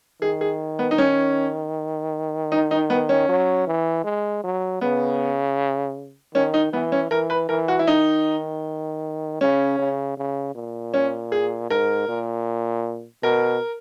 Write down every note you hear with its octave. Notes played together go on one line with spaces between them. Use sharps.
D#3 G#4
G#4
B3
D#4
C#4
D#4
D#4
B3
C#4
F#3
E3
G#3
F#3
C#3 B3
D#3 C#4
D#4
E3 B3
C#4
E3 A#4
B4
E3 A#4
F#4
E4
D#3 D#4
C#3 C#4
C#3
C#3
A#2
C#4
G#4
G#2 A#4
A#2
B2 A#4